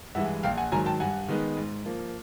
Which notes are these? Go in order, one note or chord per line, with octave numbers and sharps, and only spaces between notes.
G2 E3 G#3 E5 F#5
A#1 F5 G5
F#5 G#5
G#2 D#3 F#3 G#5 A#5
G5 A5
G2 F#5 G#5
D#3 G#3 B3 D#4
G#2
F3 A#3